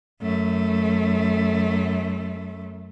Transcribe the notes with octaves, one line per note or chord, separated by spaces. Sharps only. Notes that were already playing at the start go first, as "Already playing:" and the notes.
F#2 A3